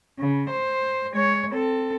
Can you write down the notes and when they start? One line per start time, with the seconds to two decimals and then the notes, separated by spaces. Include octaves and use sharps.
0.19 C#3
0.50 C5
1.13 G#3 C#5
1.51 C4 A4